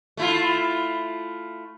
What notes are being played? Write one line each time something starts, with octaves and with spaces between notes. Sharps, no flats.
A3 E4 F4